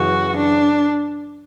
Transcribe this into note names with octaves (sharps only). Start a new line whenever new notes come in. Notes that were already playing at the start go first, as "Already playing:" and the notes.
Already playing: F#2 C#3 E3 F#4
D4